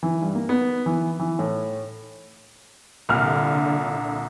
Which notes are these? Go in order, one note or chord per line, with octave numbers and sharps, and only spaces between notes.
E3
G2
A#3
B3
E3
E3
A2
C2 A#2 D3 F6